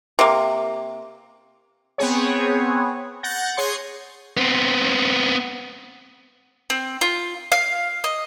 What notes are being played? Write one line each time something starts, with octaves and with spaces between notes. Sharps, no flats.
C3 A#3
B3 C4 G#4 C#5
F#5 G6 A6 A#6
G#4 C#5 C6 C#7
B3 C4
C4
F4
F5
D#5